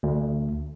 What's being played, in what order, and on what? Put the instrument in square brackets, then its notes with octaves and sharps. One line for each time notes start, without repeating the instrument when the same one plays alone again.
[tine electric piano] D2